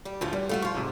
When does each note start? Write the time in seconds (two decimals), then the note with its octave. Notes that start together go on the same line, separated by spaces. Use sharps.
0.05 G3 G4
0.21 D2 A2 F3 E4 F4
0.33 E2 G3
0.49 A3 F4 F#4
0.62 F3 F4 C6 C#6
0.74 G#2 C3